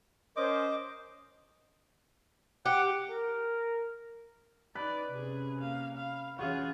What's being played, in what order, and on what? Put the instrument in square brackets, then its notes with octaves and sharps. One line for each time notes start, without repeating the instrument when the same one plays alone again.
[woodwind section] C#4 A#4 C5 [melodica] D#5 D6
[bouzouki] G4 [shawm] F#5
[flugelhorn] A#4
[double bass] D#4 [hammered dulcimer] B4 [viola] D5
[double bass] C3 C#4 [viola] G#4
[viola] A#3 F5
F5
[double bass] E3 C#4 [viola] F4 G#4 [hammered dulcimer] F#4 F5